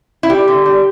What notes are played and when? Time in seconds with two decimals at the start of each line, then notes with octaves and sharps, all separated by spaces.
0.23 E4
0.30 G3 G4
0.48 D3
0.65 G3